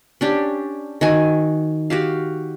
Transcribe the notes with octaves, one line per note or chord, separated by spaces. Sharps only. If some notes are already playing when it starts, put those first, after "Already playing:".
C#4 D4 G4
D#3 F#4 G#5
F#4 G4 F5